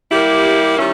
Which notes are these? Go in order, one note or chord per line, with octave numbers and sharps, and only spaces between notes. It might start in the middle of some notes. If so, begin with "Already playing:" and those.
G3 A#3 E4 G4
D#3 G3 C#4 E4